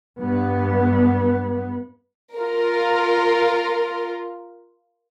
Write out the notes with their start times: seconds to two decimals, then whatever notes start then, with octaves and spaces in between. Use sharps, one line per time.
0.19 G2 B3
2.37 F4 A#4